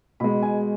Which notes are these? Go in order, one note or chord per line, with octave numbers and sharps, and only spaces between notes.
B2 G#3 B5
G#5